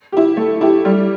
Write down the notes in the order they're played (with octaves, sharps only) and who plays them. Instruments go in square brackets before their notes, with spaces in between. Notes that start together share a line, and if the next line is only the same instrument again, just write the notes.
[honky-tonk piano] E4 G4
A3
E4 G4
G3